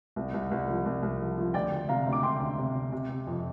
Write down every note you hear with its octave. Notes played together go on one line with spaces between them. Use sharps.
C2
C2
C2
F3
C2
C2
F3
F3
D2 D5 G5
D2
C3 F5 A#5
D2
D6
C3 G5 C6
D2
C3
C3
C3
C3
F2